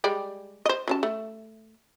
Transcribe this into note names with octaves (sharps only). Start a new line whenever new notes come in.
G3 G#3 D5
C5 D#5
F#3 C#4 A5
A3